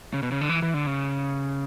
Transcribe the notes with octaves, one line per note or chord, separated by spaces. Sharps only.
C#3
B2
C#3
D3
E3
E3
D3
C#3